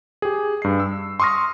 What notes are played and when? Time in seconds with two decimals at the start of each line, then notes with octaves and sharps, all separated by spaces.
0.22 G4 G#4
0.62 G2 C7
0.80 E6
1.20 C6 C#6 D#6 F6 A#6